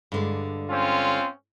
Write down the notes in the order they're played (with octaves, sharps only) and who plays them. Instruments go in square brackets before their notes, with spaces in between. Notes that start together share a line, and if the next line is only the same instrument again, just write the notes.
[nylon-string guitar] G2 D3 G#3
[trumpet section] C4 C#4 F4